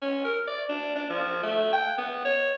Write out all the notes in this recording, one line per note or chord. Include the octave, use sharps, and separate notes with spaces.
C#4
A#4
D5
D4
D4
F3
A3
G5
B3
C#5